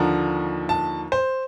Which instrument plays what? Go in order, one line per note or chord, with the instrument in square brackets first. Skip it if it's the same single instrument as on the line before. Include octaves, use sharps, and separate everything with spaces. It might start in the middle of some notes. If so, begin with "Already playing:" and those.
Already playing: [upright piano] D#2 D3 F3 A#5
A5
C5